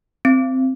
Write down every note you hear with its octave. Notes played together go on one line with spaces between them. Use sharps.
C4